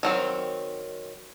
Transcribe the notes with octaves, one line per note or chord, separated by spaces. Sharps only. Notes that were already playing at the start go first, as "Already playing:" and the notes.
D#3 F#3 C4